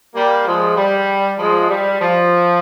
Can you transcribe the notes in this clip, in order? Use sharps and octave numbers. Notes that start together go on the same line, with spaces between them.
G3 A#3
F3 G#3
G3
F3 G#3
G3
F3